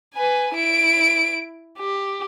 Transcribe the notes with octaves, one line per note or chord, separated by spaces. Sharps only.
B4 G#5
E4 D7
G4